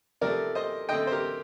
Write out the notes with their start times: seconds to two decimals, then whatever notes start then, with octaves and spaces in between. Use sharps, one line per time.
0.21 C3 F3 A3 A#4 D5
0.55 C5 D#5
0.89 D3 A3 C4 D#5 G5
1.07 C5
1.12 G4 A#4